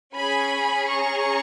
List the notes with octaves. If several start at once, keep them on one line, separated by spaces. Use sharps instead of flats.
C#4 G#4 G#5 B5
A#5 C#6